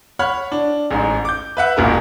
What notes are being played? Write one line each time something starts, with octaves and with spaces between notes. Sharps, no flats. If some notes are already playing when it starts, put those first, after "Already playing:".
C#5 F#5 B5 F6
D4
A1 G#2
D6 G6
B4 E5 F#5
E1 A1 A#2 A#4 B4